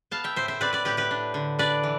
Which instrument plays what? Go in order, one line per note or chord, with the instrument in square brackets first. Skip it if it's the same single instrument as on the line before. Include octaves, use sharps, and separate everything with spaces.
[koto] B3 F5 A5
E5 G5
A2 C5 E5
C5 E5
C4 B4 D5
B4 D5
A2 G4 B4
G4 B4
D4
D3
D4 B4 D5
E3